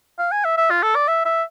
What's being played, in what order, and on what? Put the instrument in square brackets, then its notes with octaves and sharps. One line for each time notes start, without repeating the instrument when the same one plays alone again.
[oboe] F5
G#5
E5
E5
F4
A4
D5
E5
E5